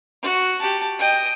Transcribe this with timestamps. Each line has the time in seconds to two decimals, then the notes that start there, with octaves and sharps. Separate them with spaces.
0.23 F#4
0.59 G4 A5
0.99 D#5 G5